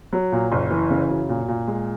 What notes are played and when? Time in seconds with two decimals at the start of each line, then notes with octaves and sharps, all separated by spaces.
0.13 F#3
0.32 A#2
0.52 F#1
0.71 E3
0.90 C#3
1.09 F#2
1.29 A#2
1.48 A#2
1.67 G#3